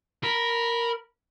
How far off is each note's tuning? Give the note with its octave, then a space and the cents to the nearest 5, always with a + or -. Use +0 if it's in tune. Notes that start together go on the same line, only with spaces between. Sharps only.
A#4 +0 B5 -15